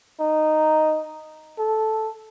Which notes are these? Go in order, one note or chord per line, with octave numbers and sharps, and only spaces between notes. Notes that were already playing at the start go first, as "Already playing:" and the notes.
D#4
A4